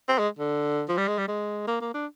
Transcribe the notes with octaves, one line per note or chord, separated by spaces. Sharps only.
C4
G#3
D3
F3
G3
G#3
G3
G#3
A#3
A#3
D4